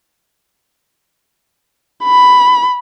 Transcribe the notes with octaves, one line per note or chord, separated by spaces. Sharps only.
B5